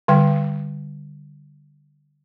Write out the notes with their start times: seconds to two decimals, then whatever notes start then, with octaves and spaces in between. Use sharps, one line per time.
0.08 D3 G3 G5